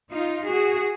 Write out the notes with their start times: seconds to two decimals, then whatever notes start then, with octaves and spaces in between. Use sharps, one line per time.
0.13 D#4 F4
0.47 F#4 G#4